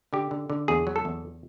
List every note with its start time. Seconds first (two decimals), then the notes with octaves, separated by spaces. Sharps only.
0.13 D3 G4
0.31 D3
0.50 D3
0.68 E2 G#4
0.87 F#3
0.96 A4
1.05 E2